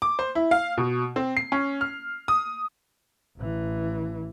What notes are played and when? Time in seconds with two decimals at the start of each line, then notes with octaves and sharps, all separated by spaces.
0.02 D6
0.19 C5
0.35 E4
0.51 F5
0.78 B2
1.16 C4
1.37 C7
1.52 C#4
1.81 F6
2.28 D#6
3.38 A1 E3